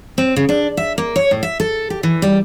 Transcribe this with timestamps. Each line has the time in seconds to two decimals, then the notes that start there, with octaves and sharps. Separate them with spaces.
0.18 C4
0.36 C#3
0.49 D4
0.77 E5
0.98 A#3
1.16 C#5
1.31 A2
1.43 E5
1.60 A4
1.90 G4
2.03 E3
2.22 G3